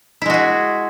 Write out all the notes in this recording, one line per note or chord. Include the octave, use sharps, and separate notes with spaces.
G#3 E4 F#4 G#4